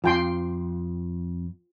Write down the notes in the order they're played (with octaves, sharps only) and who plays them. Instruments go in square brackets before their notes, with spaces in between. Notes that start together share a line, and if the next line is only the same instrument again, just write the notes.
[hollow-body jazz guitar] F2 [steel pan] F4 G5 C6